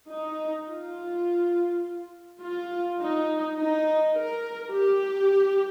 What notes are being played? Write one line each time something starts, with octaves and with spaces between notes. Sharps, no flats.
D#4
F4
F4
D#4
D#4
A#4
G4